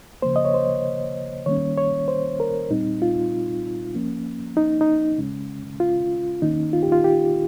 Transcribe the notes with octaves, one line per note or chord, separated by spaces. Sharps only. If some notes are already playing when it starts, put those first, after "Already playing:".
C#3 F3 A#3 C5
D#5
C#5
C5
D#3 G3 A#3 C#4 C#5
C#5
C5
A#4
A#2 G3 C4 D#4
F4
F3 A#3 C#4
D#4
D#4
C#3 G#3 C#4
F4
D#3 A#3 C#4 D#4
F4
G4
F4
G4